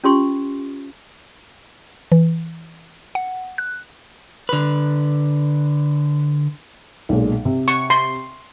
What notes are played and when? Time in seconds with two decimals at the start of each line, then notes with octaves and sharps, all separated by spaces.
0.04 C#4 F4 G4 C6 C#6
2.12 E3
3.15 F#5
3.58 F#6
4.49 D3 B4
7.09 B1 A#2 G#3
7.45 C3
7.68 C#6
7.90 C6